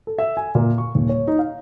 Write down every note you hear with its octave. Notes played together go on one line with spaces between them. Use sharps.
A4
E5
G#5
A#2
C#6
D#1
C#5
D#4
F5